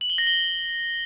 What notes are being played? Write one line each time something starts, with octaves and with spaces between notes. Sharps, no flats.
F#7
G7
A#6
G7